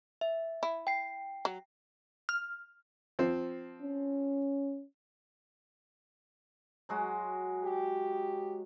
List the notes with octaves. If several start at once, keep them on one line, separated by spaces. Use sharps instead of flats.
E5
E4
G5 C7
F#3
F6
F3 C4
C#4
F#3 G#3 F#4
G4